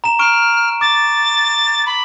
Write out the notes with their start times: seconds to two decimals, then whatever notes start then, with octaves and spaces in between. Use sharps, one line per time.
0.04 A#5 E7
0.19 C#6 F6 D7 E7
0.81 D6 A6
1.86 B5